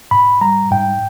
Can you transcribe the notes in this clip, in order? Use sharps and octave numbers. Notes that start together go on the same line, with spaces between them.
G#2 B5
G3 A#5
G#2 G5